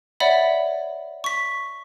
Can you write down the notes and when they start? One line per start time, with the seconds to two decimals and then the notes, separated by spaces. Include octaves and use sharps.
0.20 C#5 D5 E5 F#5 B5
1.24 C#6 B6